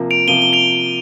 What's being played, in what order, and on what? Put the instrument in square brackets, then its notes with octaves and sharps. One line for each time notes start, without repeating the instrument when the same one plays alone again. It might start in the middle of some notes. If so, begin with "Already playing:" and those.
Already playing: [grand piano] C3 F3 A#3
[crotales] D7 F7
[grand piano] C3 F3 A#3 [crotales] D#7 G7
[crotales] G7
D7 F7